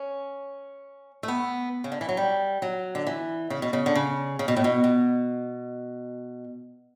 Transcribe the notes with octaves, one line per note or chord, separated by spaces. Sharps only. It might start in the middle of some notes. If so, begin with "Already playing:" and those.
Already playing: C#4
A3
B3
C#3
D3
E3
F#3
G3
F#3
D3
E3
C#3
B2
C#3
D3
C#3
C#3
B2
A2
B2
B2